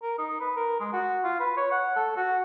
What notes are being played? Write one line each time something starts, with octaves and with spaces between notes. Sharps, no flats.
A#4
D#4
B4
A#4
G#3
F#4
F4
B4
C#5
F#5
A4
F#4